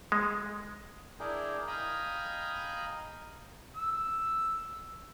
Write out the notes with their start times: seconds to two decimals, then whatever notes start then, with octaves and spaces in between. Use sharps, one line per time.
0.12 G#3
1.20 D4 E4 G#4 A#4 G5
1.67 D#5 F5 G5 G#5 A#5 B5
3.76 E6